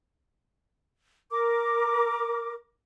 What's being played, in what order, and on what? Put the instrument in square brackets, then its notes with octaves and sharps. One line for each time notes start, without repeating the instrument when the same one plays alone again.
[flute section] A#4 D6